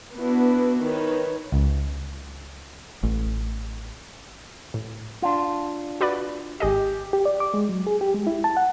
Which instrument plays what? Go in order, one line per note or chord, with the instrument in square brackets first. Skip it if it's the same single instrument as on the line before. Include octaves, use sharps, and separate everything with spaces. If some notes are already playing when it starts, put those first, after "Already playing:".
[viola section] B3 D4 E4 F#4 B4
D#3 B4 C#5
[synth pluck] C#2
[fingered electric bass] A1
[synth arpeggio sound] A2
[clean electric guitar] D4 F4
[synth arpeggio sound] F#4 B4 D5
[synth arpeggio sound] G#1 G#4 D#5 [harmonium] G4
[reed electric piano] G4
D5
D6
G#3
F#3
G#4
G4
G#3
E4
A5
F#5